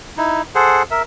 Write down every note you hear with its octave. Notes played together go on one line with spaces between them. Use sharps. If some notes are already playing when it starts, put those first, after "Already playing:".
D#4 E4
G#4 A4 C5 F#5
A#4 E5